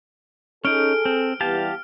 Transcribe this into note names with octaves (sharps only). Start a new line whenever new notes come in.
C#4 D#4 G#4 A4 F6 D7
C4
E3 G3 B3 G4 F5 A5